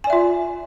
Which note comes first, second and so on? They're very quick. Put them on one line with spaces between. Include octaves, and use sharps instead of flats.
G#5 D5 E5 F4